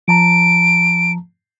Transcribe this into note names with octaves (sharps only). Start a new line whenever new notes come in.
F3 A5 A#5 D7